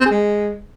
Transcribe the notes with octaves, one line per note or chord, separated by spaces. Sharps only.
C4
G#4
G#3